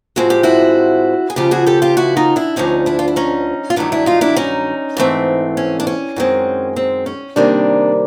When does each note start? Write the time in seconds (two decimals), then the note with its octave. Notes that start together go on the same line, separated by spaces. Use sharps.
0.16 A2 F3 G#3 C4 F#4
0.30 G4
0.43 E4 F#4
1.30 G#4
1.36 D#2 C#3 F3 F4 G4
1.51 F#4 G#4
1.66 G4 A4
1.82 F4 G4
1.97 E4 F#4
2.17 D#4 F4
2.36 D4 E4
2.56 D2 D3 F3 A3 C#4 D#4
2.86 D4 E4
2.99 F4
3.08 E4
3.16 C#4 D#4
3.70 F4
3.76 G2 D#3 F#3 A3 D4 E4
3.92 D4 E4
4.06 D#4 F4
4.21 D4 E4
4.36 C#4 D#4
4.97 G#2 E3 A3 C4
5.57 C#4
5.80 D4
5.87 C#4
6.16 F#2 D#3 G#3 C4
6.76 C4
7.06 C#4
7.36 C3 D#3 G3 A#3 C4 D4